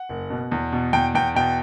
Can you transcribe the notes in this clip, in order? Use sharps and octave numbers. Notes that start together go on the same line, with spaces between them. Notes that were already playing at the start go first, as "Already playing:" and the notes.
Already playing: F#5
F#1
B2
E2
B2
E2 G5
E2 G5
B2 G5